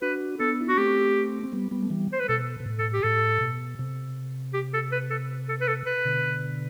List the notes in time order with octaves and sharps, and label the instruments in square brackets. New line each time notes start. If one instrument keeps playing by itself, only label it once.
[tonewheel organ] D4 F#4 [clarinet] B4
[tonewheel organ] B3 D4 [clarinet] A4
[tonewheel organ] E4
[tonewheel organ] D4 [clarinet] F#4
[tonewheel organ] A3 C4 [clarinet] G4
[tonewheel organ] C4
G3 B3
G3 B3
A3
E3 G3
[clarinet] C5
B4
[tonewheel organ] B2 [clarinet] A4
[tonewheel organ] B2
A2
[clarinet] A4
G4
[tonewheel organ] A2 [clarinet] A4
[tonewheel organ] B2
C3
[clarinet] G4
A4
B4
A4
A4
B4
A4
B4
[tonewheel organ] B2 D3